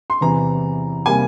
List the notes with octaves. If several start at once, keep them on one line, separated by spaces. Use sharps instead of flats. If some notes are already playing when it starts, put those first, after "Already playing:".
C6
E2 C3 E3 A#5
C3 G3 A#3 G#5